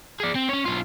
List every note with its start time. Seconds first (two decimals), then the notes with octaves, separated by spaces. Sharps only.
0.20 G#4 D5
0.35 C4
0.49 C#4 C#5
0.66 B1 F4